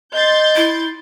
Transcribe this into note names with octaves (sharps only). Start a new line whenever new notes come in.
D#5 C6 G6 A6
E4